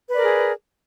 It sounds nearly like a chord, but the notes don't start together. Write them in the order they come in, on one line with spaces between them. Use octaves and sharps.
B4 D5 A#4 G#4